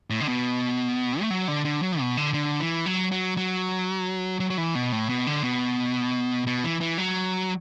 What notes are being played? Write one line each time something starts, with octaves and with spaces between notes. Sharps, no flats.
A2
D3
B2
A3
F#3
D3
D3
F#3
B2
D3
D3
E3
F#3
F#3
F#3
F#3
F#3
E3
B2
A2
B2
D3
B2
B2
E3
E3
F#3